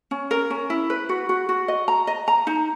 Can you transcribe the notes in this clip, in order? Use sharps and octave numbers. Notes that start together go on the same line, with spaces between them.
C#4
A#4
C#4
E4
B4
F#4
F#4
F#4
D#5
A#5
D#5
A#5
D#4